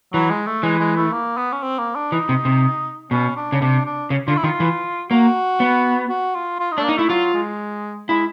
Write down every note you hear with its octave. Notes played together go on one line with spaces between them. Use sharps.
E3 F#3
G#3
A3
E3 G#3
G#3
A3
A#3
B3
C#4
C4
A#3
D4
E3 D#4
C3
C3
B2 C#4
D4
C#3
C3 D4
D4
C#3
D3 F4
E4
D#3 F4
E3
A#3 F#4
B3
F#4
F4
F4
D#4
A3 D4
A#3 D#4
A3 E4
F#3 F4
G#3
G#3 E4